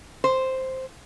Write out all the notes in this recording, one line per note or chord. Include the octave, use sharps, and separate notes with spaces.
C5